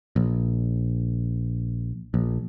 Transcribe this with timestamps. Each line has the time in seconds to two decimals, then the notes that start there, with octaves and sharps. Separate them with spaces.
0.16 A#1
2.14 A#1